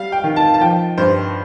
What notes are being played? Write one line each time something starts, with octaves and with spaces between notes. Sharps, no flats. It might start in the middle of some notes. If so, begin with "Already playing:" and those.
Already playing: G3 F5
G5
D#3
A5
A5
F3 G5
G2 C5